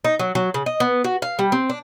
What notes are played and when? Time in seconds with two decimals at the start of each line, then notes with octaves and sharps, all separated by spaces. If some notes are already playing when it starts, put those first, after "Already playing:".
0.05 D#4
0.19 F#3
0.35 F#3
0.54 C#3
0.66 D#5
0.80 B3
1.04 F#4
1.22 F5
1.39 G3
1.52 C4
1.70 D4